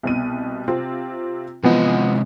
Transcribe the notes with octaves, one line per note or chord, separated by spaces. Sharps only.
C2 B2 D#7
C3 C4 F4
C3 E3 F3 G#3 B3 D#5